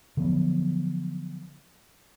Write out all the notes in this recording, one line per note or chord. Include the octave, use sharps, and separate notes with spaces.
D3 F3 F#3 B3